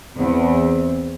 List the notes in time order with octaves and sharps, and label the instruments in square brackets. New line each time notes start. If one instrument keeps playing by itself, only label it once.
[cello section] E2 [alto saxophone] C4